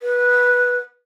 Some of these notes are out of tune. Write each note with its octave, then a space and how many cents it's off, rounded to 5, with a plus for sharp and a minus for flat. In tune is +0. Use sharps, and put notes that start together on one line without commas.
B4 -10